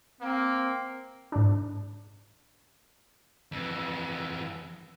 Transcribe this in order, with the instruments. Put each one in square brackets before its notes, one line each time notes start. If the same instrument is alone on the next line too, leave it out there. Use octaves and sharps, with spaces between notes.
[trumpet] A#3 [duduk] C4
[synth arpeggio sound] G#2 D4
[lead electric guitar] F2 E3